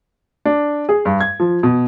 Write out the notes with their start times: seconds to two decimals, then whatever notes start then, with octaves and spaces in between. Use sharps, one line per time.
0.45 D4
0.89 G#4
1.05 G2
1.21 G#6
1.40 F3
1.63 B2